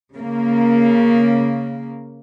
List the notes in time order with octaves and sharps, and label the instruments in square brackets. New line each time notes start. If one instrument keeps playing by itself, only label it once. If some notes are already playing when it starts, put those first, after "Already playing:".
[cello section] C#3 A#3